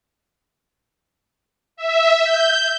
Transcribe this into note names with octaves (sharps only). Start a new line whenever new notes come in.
E5
G6